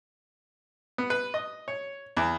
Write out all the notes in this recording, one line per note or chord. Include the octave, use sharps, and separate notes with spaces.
B3
B4
D#5
C#5
E2